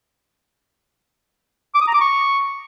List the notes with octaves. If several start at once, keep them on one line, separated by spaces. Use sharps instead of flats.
D6
D#6
A#5
D6
C#6